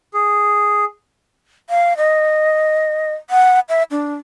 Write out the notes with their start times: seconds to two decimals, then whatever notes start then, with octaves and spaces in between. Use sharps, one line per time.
0.14 G#4
1.70 F5
1.97 D#5
3.30 F#5
3.69 E5
3.91 D4